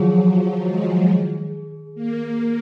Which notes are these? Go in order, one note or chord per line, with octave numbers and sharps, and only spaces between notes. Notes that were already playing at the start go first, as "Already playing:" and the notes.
Already playing: D#3 F3 F#3 G#4
G#3
A#3